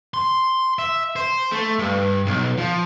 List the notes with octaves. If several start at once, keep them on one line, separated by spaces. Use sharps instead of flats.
C6
E5
C5
A3
G2
B1
F3